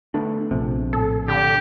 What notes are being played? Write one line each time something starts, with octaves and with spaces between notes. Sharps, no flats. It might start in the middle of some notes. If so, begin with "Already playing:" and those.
D3 A3 B3 D4
A#1 C3
A2 A4
D3 G4